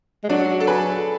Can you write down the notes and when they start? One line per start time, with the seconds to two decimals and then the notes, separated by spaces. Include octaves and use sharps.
0.24 G#3
0.29 F#3 D4 F#4
0.60 A4
0.67 G#4 B4